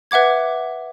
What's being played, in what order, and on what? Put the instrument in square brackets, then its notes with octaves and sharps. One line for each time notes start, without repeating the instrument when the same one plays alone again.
[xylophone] B4 E5 F#5 D6 G#6